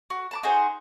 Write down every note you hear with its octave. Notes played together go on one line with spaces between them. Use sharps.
F#4
A5 A#5 D6
D#4 F#4 G#4 C5